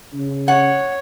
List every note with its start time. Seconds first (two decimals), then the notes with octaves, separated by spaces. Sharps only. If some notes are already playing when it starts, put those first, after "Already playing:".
0.13 C#3
0.48 C#5 F#5